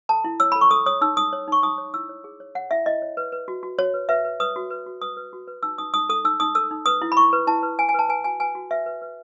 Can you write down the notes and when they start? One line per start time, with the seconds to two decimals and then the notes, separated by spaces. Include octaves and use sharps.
0.09 A4 A5
0.24 E4
0.40 C#5 E6
0.52 A4 B5
0.61 C#6
0.71 A4 D#6
0.86 C#5 D#6
1.01 D#4 E6
1.17 D#4 D#6
1.33 C#5
1.48 D#4 C#6
1.63 D#4 D#6
1.78 C#5
1.94 E4 E6
2.09 C#5
2.24 G#4
2.40 C#5
2.55 C#5 F#5
2.71 E4 E5
2.86 E4 D#5
3.02 C#5
3.17 B4
3.32 B4
3.48 F#4
3.63 F#4
3.78 F#4 C#5
3.94 B4
4.09 B4 E5
4.25 B4
4.40 B4 D#6
4.56 F#4
4.71 B4
4.86 F#4
5.02 B4 D#6
5.17 B4
5.33 F#4
5.47 B4
5.63 D#4 E6
5.78 D#4 D#6
5.94 D#4 D#6
6.09 A4 D#6
6.25 D#4 E6
6.40 D#4 D#6
6.55 A4 E6
6.71 D#4
6.86 B4 D#6
7.02 E4
7.12 B5
7.17 E4 C#6
7.33 B4
7.47 E4 A5
7.63 B4
7.79 B4 G#5
7.89 G#5
7.94 B4 A5
8.09 B4 G#5
8.24 F#4 G#5
8.40 B4 G#5
8.55 F#4
8.71 B4 E5
8.86 B4
9.02 B4